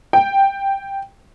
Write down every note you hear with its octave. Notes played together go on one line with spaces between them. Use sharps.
G5